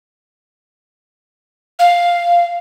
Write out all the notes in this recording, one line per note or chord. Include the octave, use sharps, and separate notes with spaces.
F5